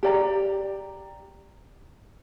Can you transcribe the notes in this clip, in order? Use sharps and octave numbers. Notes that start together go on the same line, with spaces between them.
G4 D5 A#5